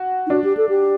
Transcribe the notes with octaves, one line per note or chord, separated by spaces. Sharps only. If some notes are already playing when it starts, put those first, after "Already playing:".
Already playing: F#4
D#4
D4 F#4
G4
A4
G4